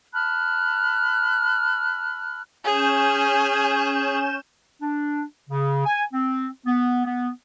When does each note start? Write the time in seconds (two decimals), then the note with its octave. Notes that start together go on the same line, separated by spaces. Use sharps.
0.13 A5 B5 F6 F#6
2.65 C#4 G#4 G#5 G6 E7
4.81 D4
5.49 C#3
5.86 G#5
6.12 C4
6.65 B3
7.06 B3